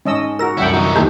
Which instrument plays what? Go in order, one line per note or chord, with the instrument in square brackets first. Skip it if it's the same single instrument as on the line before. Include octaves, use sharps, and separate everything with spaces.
[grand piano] G#2 A5 C#6 [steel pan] C#4 D#5 E6
[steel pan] F#4 A#4 [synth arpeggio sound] E6 A#6
[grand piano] C2 F#2 [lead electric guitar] A3 E4 [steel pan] E5 F#5 G5
[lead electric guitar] E3 D#4 [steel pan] F#4
[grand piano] D#2 F3 D#5 [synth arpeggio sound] A3 A#3 G4